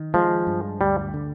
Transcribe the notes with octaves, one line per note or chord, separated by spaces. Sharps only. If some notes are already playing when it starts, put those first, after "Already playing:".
Already playing: D#3
F3 G#3
G2
D2 G3
D3